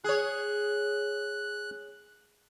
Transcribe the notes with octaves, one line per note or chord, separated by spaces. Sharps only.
G#4 C#5 F#6